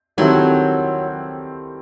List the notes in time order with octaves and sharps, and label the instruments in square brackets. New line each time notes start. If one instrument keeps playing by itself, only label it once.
[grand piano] D#3 G3 C4 E4 A4 [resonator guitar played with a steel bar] F#3